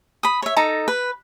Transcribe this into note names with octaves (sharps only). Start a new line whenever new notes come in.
B5 D#6
C#5 E5
D#4 A4 A#5
B4